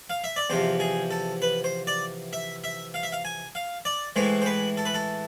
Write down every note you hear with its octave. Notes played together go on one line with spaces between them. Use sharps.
F5
E5
D5
E2 C3 F3 C5
G#4
A4
B4
C5
D5
E5
E5
F5
E5
F5
G#5
F5
D5
A2 E3 G#3 C5
C5
B4
A4
B4
A4